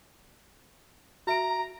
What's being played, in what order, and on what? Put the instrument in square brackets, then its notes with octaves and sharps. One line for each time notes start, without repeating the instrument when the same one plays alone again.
[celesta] F#4 E5 D7 [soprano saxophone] A#5